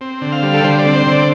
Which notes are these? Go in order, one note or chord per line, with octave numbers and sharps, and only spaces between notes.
C4
D3
F5
G3
A4
D3 C5
D5
C4
C5
D3 D5